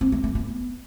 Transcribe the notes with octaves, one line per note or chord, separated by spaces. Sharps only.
C4
A3
A3
B3